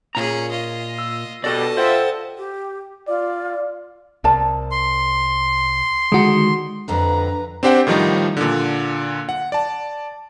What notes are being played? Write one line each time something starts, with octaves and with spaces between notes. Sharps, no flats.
A#2 C#4 G#4 A#5
F4 D#5
E6
B2 G3 A4 D5 D#5 A5 A#6
F4 C5 E5 F#5 G5
G4
F4 D5
C2 A#4 D5 A5
C6
D3 D#3 G#3 D#4 F#4
F2 D3 D4 B4 A#5
C4 D4 G4 C5 F#5 G5
A2 D#3 F3 G3 D#4
A#2 D3
F#5
D5 A5